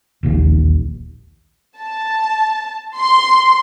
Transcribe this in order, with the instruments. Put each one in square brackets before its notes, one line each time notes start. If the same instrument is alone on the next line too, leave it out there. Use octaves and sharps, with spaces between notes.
[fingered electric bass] E1 A#1 D#2
[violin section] A5
C6